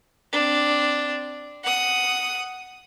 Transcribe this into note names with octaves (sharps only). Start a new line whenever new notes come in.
C4 D4
F#5 D#6